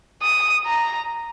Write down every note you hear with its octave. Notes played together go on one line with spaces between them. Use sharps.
D#6
A#5